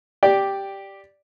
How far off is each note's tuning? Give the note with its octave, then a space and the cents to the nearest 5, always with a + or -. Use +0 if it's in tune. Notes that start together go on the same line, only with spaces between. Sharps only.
G4 +0 D5 +0